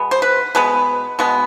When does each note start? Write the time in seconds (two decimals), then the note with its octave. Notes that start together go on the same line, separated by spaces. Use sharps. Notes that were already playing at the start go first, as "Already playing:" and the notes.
Already playing: B2 G#3 B3
0.11 C5
0.22 B4
0.55 B2 G#3 B3 B4
1.19 B2 G#3 B3